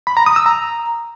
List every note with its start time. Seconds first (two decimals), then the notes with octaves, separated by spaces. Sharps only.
0.07 B5
0.17 A#5
0.26 D#6
0.36 E6
0.46 A#5